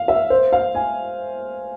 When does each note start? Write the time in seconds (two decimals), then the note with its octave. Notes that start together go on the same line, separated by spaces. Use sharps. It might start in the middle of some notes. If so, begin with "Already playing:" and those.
Already playing: F5
0.08 E5
0.30 C5
0.53 F5
0.75 G#5